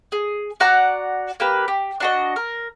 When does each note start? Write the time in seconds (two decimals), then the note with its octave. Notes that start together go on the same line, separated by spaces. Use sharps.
0.12 G#4
0.60 F#4 D5 F#5 A#5
1.40 A#3 G4 B4
1.68 G4
2.00 D4 F#4 D#5
2.36 A#4